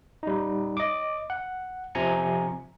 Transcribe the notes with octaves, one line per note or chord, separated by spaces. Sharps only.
G3 D#4
D#5 D6
F#5
C3 F3 G#5 A#5 C#7